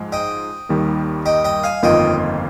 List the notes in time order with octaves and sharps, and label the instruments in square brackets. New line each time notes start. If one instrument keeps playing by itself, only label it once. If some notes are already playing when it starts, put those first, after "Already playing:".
Already playing: [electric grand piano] G#2 F3 G#3
[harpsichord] D#5 G5
[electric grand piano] D#2 D#3 G3 A#3
[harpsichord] D#5 G5
D#5 G5
F5 G#5
[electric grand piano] G1 F2 D#3 A#3 F4 [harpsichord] D#5 G5